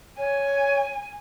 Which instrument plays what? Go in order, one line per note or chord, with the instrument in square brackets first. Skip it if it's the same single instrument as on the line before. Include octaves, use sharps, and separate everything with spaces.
[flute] C#5 [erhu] G#5